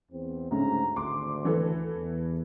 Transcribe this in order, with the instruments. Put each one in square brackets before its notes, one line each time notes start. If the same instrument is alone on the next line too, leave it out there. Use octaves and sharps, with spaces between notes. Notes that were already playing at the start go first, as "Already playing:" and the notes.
[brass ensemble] E2 C4
[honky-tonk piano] D2 C#3 [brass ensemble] G#2 A#5
[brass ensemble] G#1 D2 [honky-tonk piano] C6 D6
[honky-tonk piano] E3 A4
[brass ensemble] E2